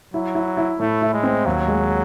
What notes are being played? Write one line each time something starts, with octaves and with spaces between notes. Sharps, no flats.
F#3 E4
E4
E4
A2 A3
E4
G#3
C4
D#2 F#3
G#3